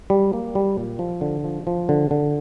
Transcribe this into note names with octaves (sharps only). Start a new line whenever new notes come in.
G3
A#3
G3
A#2
F3
D3
F3
F3
D3
D3